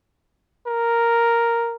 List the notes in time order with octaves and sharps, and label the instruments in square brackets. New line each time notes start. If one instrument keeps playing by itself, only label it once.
[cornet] A#4